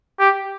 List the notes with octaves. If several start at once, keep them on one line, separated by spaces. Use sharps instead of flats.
G4